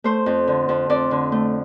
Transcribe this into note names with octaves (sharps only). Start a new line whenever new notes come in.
A3 C5
F2
D3
F2
F2 D5
D3
A3